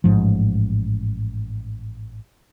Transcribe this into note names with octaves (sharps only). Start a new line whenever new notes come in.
A1 G#2 F3